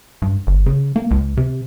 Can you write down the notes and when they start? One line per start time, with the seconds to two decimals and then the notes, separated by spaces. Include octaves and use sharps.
0.22 G2
0.47 G1
0.66 C#3
0.96 A#3
1.11 C#2
1.37 C3